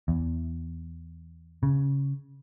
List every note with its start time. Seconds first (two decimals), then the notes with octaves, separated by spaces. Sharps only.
0.08 E2
1.63 C#3